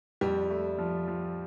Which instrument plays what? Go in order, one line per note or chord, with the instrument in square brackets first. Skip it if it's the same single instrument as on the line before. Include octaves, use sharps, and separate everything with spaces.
[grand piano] F2 [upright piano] G3
[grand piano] A3
F3
F3